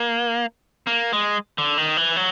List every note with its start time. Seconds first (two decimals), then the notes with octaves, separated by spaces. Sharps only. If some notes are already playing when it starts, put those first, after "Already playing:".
Already playing: A#3
0.87 A#3
1.13 G#3
1.58 D3
1.78 D#3
1.97 E3
2.16 F#3